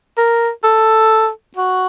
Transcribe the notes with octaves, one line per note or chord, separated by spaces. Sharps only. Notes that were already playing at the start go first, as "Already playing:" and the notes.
A#4
A4
F#4